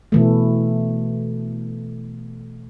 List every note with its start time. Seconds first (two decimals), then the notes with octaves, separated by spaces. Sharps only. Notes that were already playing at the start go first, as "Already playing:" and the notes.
0.12 B2 E3 A3